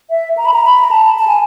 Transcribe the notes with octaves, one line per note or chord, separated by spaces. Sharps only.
E5
A#5
B5
A#5
B5
A#5
A5
A5
G#5